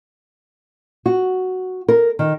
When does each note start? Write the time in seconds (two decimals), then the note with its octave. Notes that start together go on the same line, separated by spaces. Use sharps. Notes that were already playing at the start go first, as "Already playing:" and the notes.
1.06 F#4
1.88 A#4
2.19 D#3